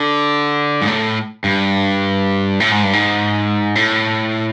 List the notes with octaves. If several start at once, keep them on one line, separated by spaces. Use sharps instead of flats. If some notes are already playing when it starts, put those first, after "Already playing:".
Already playing: D3
G#2
A2
G2
A2
G#2
G2
G#2
A2